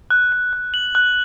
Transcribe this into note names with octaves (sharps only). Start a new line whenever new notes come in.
F#6
F#6
F#6
F#7
F#6